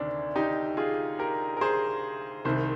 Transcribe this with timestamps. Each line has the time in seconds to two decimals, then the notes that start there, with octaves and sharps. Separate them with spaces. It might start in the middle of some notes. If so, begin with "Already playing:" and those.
Already playing: D2 C3 D#3 D4
0.36 D#4 G4
0.77 F4 G#4
1.19 G4 A#4
1.57 A#4
1.61 G#4 C5
2.45 C2 C3 D#3 C5